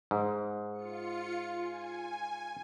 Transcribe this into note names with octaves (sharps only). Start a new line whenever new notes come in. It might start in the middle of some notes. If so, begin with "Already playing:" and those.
G#2
F4 C#7
G#5